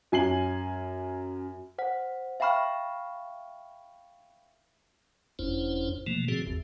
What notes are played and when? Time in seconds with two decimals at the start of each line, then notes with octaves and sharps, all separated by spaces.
0.12 F#2 G#5 C7 F#7
1.78 C5 F#5
2.40 E5 F5 G5 B5 C#6 F6
5.39 F#1 F2 C#4 D4 E4 C5
6.07 B2 E3 F3 A3 A#3
6.28 A2 D3 F3 C4 F#4 G#4
6.47 A1 E2